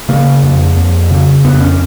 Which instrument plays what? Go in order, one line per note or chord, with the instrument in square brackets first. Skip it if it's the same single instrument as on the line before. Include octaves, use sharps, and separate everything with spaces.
[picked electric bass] C#3 A#3
F2
F2
C#3
F2 B3
C#4